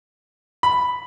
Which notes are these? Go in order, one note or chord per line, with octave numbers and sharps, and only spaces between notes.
B5